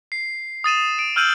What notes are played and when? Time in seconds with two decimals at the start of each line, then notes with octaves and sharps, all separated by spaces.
0.12 C7
0.64 D#6 A6 D#7 E7
0.99 D7
1.16 E6 F6 G6 D#7 F#7